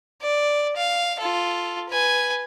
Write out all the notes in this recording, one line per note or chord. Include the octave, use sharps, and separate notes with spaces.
D5
F5
F4 A4
B4 G#5